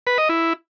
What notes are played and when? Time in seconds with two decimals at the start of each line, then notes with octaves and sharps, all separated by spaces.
0.07 B4
0.18 D#5
0.29 E4